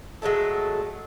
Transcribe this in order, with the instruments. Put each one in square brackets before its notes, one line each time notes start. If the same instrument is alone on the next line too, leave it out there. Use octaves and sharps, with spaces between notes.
[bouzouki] F#3 G#3 A3 A4